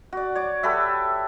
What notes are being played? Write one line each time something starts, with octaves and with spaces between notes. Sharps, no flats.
F#4 D5
C#5 D5 D6
G4 A4 B4 E5